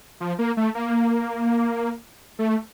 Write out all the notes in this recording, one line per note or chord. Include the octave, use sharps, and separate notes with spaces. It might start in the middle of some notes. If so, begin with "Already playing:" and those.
F3
A#3
A3
A#3
A3